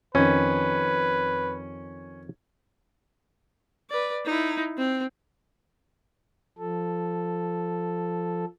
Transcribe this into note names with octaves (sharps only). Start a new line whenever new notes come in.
F2 D#3 C#4 B4
B4 D5
D#4 E4
C4
F3 A4